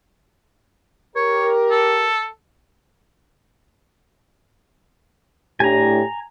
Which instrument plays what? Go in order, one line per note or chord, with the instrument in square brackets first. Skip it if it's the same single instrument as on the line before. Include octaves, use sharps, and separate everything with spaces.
[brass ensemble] G4 A#4 [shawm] C#5
[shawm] A4
[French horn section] A2 D4 G4 [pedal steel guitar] G#5 A#5